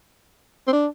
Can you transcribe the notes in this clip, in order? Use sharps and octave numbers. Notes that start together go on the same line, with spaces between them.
C4
D4